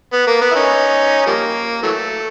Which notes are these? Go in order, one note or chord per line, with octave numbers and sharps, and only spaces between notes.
B3
A#3
B3
E4
C#4 D#4
F3 G3 A#3
E3 F#3 A3